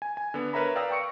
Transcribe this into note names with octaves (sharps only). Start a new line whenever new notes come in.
G#5
G#5
D3 B3
A#4 B4 C#5 E5 A#5 B5
D5 F5 G5 D#6 E6 A#6
G5 C#6 C#7 D7